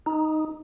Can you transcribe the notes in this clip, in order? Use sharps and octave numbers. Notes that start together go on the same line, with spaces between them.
D#4